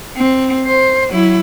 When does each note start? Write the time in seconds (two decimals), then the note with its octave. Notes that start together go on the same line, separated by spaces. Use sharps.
0.16 C4
0.66 C5
1.10 F#3 E4